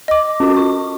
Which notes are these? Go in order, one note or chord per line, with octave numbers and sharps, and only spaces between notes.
D#5 D6
C#4 F4 F#4
C#6